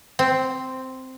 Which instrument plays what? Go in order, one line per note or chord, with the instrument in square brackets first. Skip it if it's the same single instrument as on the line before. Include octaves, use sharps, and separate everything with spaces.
[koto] C4